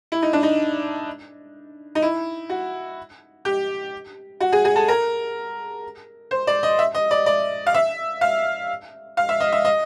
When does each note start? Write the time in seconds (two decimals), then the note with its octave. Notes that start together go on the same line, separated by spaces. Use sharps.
0.12 E4
0.22 D#4
0.33 D4
0.43 D#4
1.95 D#4
2.02 E4
2.50 F#4
3.45 G4
4.40 F#4
4.52 G#4
4.65 G#4
4.76 A4
4.88 A#4
6.31 C5
6.47 D5
6.63 D#5
6.79 E5
6.94 D#5
7.11 D5
7.26 D5
7.66 F5
7.74 E5
8.21 F5
9.17 F5
9.29 E5
9.40 D#5
9.52 E5
9.65 D#5